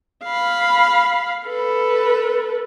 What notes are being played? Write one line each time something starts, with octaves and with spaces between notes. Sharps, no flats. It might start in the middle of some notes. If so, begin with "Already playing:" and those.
F5 B5
A4 B4